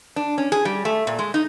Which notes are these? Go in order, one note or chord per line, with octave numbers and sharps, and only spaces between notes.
D4
C#4
G#4
G3
A3
A#2
G#3
D#4